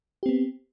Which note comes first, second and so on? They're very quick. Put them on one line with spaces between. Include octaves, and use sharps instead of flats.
G4 C4 B3